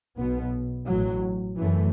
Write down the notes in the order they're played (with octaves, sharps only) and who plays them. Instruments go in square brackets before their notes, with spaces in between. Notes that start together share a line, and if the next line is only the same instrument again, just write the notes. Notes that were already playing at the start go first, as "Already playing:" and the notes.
[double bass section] B1 B2 B3
A1 A2 F#3
F#2 E3 A3